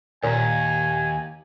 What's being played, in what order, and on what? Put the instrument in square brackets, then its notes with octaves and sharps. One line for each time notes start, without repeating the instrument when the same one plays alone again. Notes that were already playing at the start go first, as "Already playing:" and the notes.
[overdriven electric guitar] D#2 [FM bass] A#2 [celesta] C#5 A#5 [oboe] G#5